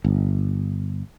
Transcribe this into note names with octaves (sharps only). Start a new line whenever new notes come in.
G1